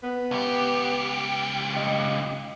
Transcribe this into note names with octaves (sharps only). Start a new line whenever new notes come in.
B3
C#2 G4
D#5